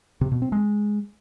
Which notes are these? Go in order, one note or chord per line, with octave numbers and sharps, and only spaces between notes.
C3
B2
C4
G#3